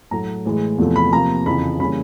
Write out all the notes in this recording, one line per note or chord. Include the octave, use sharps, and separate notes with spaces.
A2 F#3 A3 A#5
A2 E3 G#3
E2 C3 F3 A3
B5
C3 F3 A#3 A#5
F2 C#3 E3 B5
C#3 E3 G3 A#3 C#4 B5